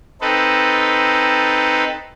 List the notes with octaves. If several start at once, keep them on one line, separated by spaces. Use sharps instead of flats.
C4 D#4 A4 B4